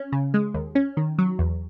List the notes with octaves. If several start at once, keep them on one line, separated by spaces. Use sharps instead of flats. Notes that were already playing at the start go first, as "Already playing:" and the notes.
Already playing: C#4
C#3
G#3
D#2
C#4
D#3
F#3
E2